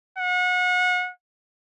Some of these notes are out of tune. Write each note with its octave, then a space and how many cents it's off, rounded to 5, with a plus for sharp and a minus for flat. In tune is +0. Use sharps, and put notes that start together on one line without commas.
F#5 -30